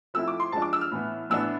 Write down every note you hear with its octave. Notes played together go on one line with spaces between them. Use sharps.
F3 A3 C4 E4 E6
D6
C6
F3 G#3 D4 A5
D6
E6
F6
A2 E3 B3
A2 E3 B3 D4 E6